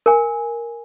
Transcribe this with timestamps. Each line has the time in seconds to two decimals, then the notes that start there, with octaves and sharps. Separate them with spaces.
0.06 A#4 G#5